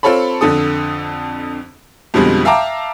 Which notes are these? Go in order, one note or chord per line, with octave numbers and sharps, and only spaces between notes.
C4 F4 A4 C#5 A5 B5
F2 D3 A4 D#6
F2 B2 D3 F3 G3 G#3
E5 F5 G5 A5 A#5 D6